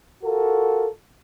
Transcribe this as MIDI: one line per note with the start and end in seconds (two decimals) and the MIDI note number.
0.24 0.87 65
0.24 0.87 66
0.24 0.87 69
0.24 0.87 70